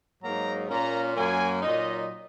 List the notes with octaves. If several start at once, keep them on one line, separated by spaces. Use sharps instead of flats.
G#2 F#3 A#3 D#4 A#5
A#2 A#3 C#4 A#5
F#2 F#3 A#3 G#5
A#2 F#3 D#4 D#5